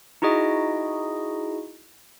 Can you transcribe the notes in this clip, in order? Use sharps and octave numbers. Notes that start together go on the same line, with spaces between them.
D#4 E4 F#4 G#4 D#5